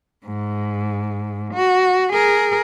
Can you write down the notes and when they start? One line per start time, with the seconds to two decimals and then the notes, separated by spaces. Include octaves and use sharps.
0.25 G#2
1.54 F#4
2.13 G#4 A#4